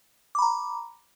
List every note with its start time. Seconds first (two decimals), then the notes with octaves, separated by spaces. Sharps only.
0.35 D6
0.39 B5
0.42 A#5